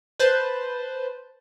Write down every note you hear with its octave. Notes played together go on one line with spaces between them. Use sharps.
B4 C5 A5